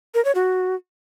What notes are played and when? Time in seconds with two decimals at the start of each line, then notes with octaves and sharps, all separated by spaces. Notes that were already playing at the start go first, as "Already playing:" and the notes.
0.14 A#4
0.25 C#5
0.35 F#4